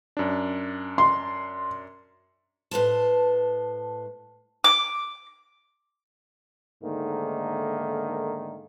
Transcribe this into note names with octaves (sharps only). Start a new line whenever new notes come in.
F#2 D4
C6
A2 B4 C5 A5
D6
G#2 D3 D#3 A3 A#3